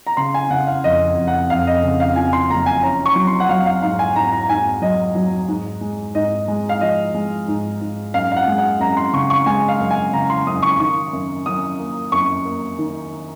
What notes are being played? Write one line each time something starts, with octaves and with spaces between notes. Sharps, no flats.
A#5
C#3 C6
G#5
C#3 F#5
F5
F2 D#5
F2
F#5
F2 F5
D#5
C#3
F5
F3 G#5
C6
F#1 A#5
G#5
C#4 A#5
C#6
F#3
C6
F#5
F#3 F5
F5
G#2 F5
G#5
G#2 A#5
A#5
G#2 G#5
F#3 D#5
F#3
G#2
G#3
G#2 D#5
G#3
F5
F3 D#5
G#3
G#2
G#2
F#2 F5
F5
F#5
G#3
F#5
F#2 A#5
C6
C#3 C#6
C#6
G#3 G#5
F5
F#2
G#5
C#3 A#5
C6
F#2 D#6
C#6
D#3 C#6
F#2
F#2 D#6
A#3
F#2 C#6
A#3
D#3